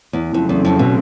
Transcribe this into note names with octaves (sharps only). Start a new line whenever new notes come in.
E2
F2 C#3 F#3 A3 C4
E2
F2
B2